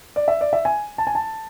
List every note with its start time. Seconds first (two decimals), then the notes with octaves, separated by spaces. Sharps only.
0.16 D5
0.28 E5
0.41 D5
0.53 E5
0.65 G#5
0.98 A5
1.07 G#5
1.15 A5